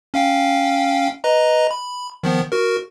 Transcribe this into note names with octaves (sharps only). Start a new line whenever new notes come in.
C#4 F5 G5
B4 D#5 A#5
B5
D#3 F3 B3
F#4 A#4